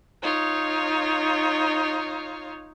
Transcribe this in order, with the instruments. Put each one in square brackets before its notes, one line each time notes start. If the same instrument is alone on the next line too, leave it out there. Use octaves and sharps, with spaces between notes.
[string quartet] D#4 F4 C#5